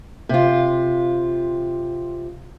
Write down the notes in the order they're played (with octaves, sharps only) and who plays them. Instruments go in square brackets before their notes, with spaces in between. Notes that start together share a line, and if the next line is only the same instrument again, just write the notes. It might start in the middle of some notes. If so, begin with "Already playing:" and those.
[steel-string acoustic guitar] C3 F4